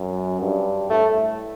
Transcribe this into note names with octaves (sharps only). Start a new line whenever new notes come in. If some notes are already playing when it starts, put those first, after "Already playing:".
Already playing: F#2
G2
A2 A3